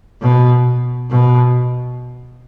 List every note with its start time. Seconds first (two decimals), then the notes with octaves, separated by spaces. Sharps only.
0.21 B2
1.10 B2